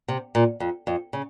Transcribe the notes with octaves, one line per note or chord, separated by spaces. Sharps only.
C3
A#2
F2
F2
C#3